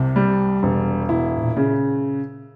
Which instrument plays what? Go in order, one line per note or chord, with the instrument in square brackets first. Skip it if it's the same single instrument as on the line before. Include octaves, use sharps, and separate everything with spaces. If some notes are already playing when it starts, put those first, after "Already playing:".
Already playing: [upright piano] C2 [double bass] C3
[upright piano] G3
E1
[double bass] B2 [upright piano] E4
[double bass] A#2
[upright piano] C#3